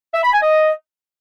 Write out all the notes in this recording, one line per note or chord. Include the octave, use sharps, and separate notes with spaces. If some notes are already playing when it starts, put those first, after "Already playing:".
E5
B5
G#5
D#5